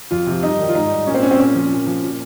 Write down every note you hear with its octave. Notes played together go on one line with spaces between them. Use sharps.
F2 F4
C3 F3
G2 D#4
D#3 G3
F4
G#2 D#4
G3
A#2 C#4
C4
G3 C#4
C4
A#2 C#4
F3
A#2
F3
A#2